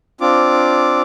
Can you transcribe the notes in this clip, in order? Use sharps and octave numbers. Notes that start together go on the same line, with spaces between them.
C4 D4 F4 D6